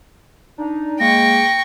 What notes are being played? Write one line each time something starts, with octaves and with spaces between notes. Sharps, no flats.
D4 D#4
G#3 A#3 G5 C#6 A#6